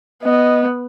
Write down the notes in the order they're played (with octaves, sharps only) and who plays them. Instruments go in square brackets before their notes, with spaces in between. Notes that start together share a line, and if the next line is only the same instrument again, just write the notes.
[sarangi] B3 [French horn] D#5